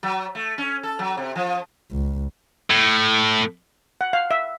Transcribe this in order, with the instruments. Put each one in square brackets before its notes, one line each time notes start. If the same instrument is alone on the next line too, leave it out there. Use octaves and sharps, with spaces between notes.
[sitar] F#3
A3
C#4
A4
F#3
C3
F3
[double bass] C#2
[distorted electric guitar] A2
[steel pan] F#5
F5
E5